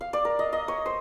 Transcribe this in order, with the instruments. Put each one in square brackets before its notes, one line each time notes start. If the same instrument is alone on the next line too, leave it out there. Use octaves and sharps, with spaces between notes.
[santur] F5
D5
A#4
D#5
D#5
C#5
C5